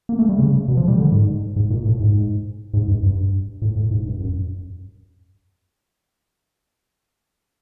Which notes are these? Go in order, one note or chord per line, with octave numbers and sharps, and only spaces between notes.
A#3
A3
G3
C#3
B2
F3
G3
D3
G#2
G#2
A#2
A2
G#2
G#2
G2
G2
A2
A2
G#2
G2
F#2